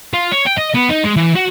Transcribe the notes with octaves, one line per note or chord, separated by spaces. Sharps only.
F4
C#5
G5
D#5
B3
D#4
G#3
E3
F#4